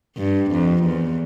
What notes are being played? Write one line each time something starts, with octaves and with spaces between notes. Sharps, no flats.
G2
F2
E2